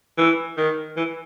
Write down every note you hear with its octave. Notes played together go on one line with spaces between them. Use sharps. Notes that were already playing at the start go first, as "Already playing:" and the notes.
E3
D#3
E3